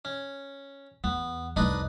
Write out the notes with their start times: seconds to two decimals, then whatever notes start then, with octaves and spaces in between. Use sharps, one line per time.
0.05 C#4
1.04 E2 B3
1.56 C2 F2 D4 D#4 B4